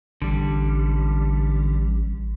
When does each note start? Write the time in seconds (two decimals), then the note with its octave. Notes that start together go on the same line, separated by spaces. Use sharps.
0.22 A1 D3 G3